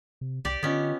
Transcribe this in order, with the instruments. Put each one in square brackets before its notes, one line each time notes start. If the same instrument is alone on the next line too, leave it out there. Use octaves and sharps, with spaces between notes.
[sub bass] C3
[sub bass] C2 [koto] G4 D5
[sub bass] D3 [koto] B3 C#4 [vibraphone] F4 D#5 C#6